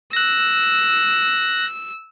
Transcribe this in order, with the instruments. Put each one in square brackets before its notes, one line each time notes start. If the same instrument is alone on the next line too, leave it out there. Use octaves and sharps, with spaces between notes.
[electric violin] E6 [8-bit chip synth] F#6 A#6